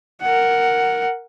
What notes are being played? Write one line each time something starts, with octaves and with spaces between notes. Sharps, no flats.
A#4 F#5